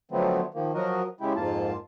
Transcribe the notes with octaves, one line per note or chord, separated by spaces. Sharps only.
D3 F3 F#3 A3 B3 C4
D#3 F3 A#3
F3 F#3 F#4 A#4 D#5
C#3 G#3 E4 G4
F2 G#2 A#3 F4 A5